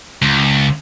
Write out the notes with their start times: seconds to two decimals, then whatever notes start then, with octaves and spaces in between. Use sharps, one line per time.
0.22 C#2